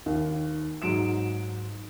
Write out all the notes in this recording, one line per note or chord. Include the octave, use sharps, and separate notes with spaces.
D#2
G#2 F#3 D7 E7